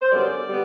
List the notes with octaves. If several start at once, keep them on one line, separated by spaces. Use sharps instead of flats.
C5
F#2 D3 G3 B3 D5
D3 G3 B3